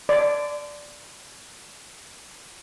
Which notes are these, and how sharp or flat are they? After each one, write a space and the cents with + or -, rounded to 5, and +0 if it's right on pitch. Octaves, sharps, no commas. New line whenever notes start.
D5 +0 C6 -35